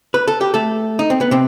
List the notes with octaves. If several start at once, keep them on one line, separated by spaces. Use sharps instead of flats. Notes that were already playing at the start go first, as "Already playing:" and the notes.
B4
A4
G4
A3 A4
D#4
C4
B3
C3 C4